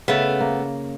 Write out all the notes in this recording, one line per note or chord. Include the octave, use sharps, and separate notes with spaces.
C#3 A3 B3
A#3